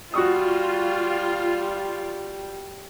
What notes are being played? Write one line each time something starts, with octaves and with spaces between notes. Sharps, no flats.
G3 F4 F#4 C#6 D#6